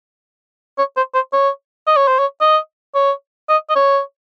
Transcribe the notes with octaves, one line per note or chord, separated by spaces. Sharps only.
C#5
C5
C5
C#5
D#5
C#5
C5
C#5
D#5
C#5
D#5
D#5
C#5